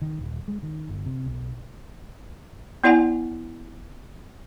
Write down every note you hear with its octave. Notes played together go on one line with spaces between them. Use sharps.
D#3
D#1
G#3
D#3
G1
C3
B1
B3 E4 D5 F#5 G#5